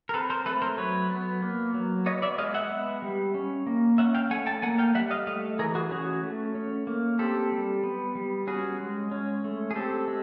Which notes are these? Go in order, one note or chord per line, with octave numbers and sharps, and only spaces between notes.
A#4
C4 A4 B4
A#4 C5
A3 A4 B4
A#4 C5
F#3 B4 C#5
B3
A#3
F#3
B3 C#5 D#5
D5 E5
G#3 D#5 F5
E5 F#5
B3
G3
C#4
A#3
C#4 E5 F#5
F5 G5
A3 F#5 G#5
G5 A5
A#3 F#5 G#5
F5 G5
G3 E5 F#5
D#5 F5
A3 D#5 F5
E3 G#4 A#4
F#4 G#4
C#4 F#4 G#4
A3
C#4
A#3
C4 G4 A4
G3
B3
G3
C#4 F#4 G#4
G#3
C#4
A3
G#4
C4 G4 A4
G#3